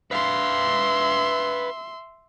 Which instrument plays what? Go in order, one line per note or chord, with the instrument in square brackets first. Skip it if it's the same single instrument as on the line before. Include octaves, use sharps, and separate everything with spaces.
[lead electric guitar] B4 F5 [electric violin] E5 C6